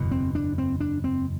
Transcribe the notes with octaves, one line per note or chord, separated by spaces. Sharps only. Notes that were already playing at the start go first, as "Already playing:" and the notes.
Already playing: F#1 E2 B2
C4
D4
C4
D4
C4